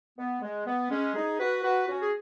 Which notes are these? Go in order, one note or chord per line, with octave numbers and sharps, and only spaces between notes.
B3
G#3
B3
G#3 C#4
D#4 G#4
F#4 B4
F#4 B4
C#4 F#4
G#4